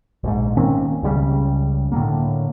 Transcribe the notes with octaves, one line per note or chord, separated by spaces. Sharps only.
A#1 G#2
D#3 A#3 C4 C#4
C#2 C#3 G3
A2 D3 A#3